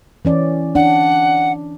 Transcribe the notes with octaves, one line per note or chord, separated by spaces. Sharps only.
E3 C#4 D5
D4 F#5